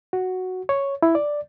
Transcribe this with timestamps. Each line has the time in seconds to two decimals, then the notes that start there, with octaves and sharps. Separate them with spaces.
0.13 F#4
0.69 C#5
1.03 E4
1.15 D5